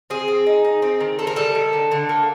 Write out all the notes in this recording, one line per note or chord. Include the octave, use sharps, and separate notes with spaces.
C4 G#4
C4
D#4
D#4
C4
D#3
C4 A4
A#4
G3 A4
D#3
D3
D3
A#3